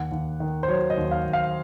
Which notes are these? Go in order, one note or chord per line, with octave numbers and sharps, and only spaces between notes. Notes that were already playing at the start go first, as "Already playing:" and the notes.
Already playing: D#2 F#5
D#2
D#3
C5
F#3 C#5
D#5
D#2
F5
D#2
F5